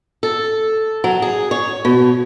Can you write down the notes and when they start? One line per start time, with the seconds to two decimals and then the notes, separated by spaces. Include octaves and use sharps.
0.23 A4
1.04 F#3
1.22 G#4
1.51 C#5
1.85 B2